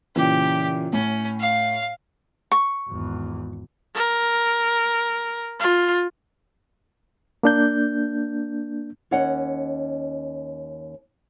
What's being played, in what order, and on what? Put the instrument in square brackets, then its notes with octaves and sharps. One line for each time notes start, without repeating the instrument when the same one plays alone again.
[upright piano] A#2 C#3 E3 [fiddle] G4
[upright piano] A2 [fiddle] C#4
[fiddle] F5
[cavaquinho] C#6
[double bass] G#1 E2
[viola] A#4
F4
[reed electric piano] A#3 D4 G6
[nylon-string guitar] D#2 C#4 C#5 D#5 F#5